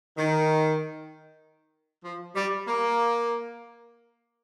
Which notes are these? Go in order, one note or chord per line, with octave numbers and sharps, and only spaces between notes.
D#3
F3
G3
A#3